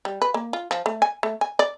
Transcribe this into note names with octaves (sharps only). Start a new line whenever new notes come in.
G3
B4
A#3
F4
F3
A3
G#5
A3
G#5
D5